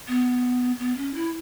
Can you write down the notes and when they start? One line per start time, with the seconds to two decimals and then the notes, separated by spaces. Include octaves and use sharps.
0.08 B3
0.79 B3
0.97 C#4
1.14 E4